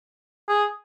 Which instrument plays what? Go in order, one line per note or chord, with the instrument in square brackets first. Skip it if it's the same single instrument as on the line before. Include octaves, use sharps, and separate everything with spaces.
[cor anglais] G#4